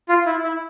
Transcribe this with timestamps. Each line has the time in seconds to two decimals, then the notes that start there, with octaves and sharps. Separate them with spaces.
0.09 F4
0.26 E4
0.43 E4